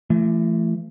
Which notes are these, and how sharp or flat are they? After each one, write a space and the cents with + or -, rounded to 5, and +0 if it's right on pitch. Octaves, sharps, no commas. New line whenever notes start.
E3 +40 A3 +0